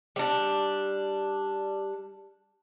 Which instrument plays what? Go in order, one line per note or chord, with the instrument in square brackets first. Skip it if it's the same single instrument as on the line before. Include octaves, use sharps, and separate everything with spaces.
[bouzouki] G3 D4